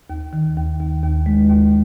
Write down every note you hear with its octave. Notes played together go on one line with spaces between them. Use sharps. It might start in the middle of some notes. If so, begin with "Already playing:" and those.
D#2
D#3
D#2
D#2
D#2
G#3
D#2